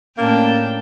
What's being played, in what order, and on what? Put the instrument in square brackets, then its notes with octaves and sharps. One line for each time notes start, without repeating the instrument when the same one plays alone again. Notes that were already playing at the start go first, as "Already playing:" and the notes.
[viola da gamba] A2 D4 [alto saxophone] A#3 [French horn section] C#4 [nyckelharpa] G5 A5